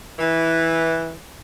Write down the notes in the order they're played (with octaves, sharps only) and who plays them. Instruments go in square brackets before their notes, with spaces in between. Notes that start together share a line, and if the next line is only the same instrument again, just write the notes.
[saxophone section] E3